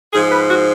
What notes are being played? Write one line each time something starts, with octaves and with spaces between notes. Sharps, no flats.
G#2 F3 G#4
B4
F#4